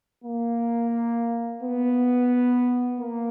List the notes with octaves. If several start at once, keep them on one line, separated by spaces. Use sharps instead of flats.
A#3
B3
A#3